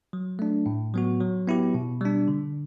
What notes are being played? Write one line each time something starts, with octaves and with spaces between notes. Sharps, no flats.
F#3
A3 D4
A2
F#3 B3 F#4
F#3
B3 E4 G4
B2
G3 D4
D3